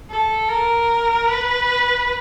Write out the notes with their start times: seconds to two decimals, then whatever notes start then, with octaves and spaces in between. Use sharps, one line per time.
0.10 A4
0.49 A#4
1.28 B4